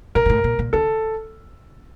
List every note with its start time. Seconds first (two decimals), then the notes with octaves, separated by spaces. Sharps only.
0.15 A#2 A#4
0.25 G2
0.29 A2
0.44 A#2
0.59 A#2
0.73 D3 A4